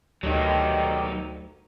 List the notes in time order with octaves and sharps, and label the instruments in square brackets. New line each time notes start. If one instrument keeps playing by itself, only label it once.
[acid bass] D2 [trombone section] D#3 G4 [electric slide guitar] F#3 D#4